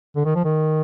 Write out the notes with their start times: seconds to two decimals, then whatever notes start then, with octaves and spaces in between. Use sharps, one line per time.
0.16 D3
0.26 D#3
0.36 F3
0.45 D#3